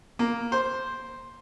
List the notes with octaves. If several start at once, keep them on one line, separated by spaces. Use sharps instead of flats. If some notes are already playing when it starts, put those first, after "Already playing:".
A#3
C5